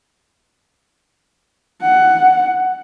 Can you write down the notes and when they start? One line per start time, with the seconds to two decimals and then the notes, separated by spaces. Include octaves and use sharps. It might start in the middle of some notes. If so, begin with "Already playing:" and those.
1.82 F#5